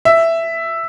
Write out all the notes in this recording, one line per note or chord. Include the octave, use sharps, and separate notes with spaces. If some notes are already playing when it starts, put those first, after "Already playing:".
E5